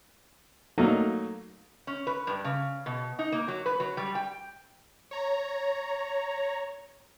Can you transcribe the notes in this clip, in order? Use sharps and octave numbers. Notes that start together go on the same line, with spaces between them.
F#3 A3 A#3 D#4
C#4
B4
G2
C#3
B2
D#4
A#3
F#3
B4
F#3
G3
G5
C#5 A#5